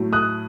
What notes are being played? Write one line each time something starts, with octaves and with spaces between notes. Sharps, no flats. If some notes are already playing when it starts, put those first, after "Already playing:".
Already playing: A2 F#3 A3
D#6 F#6